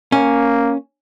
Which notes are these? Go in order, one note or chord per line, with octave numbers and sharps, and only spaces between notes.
A#3 C#4